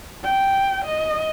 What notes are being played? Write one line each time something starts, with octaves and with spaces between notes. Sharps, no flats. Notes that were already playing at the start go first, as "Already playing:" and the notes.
G5
D#5